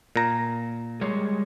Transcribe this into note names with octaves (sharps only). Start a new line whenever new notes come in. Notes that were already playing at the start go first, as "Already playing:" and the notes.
A#2 A#5
G3 G#3 C#5